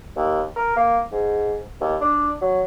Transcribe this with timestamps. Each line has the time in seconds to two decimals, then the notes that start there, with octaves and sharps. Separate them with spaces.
0.16 D#2
0.56 A#4
0.76 A#3
1.12 G#2
1.81 D#2
2.01 D4
2.42 F#3